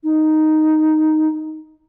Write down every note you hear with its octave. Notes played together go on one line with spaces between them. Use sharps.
D#4